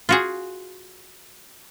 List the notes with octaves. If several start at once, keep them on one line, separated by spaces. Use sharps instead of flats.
F4 F#4 G#4